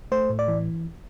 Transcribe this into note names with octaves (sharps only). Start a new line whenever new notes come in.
A3 C5
A2
D5
E3